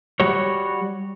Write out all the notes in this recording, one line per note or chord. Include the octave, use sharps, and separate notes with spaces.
G3 F#4 C#5